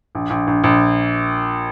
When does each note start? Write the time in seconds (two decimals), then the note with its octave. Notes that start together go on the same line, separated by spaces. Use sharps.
0.15 A#1
0.30 A#1
0.47 A#1
0.64 A#1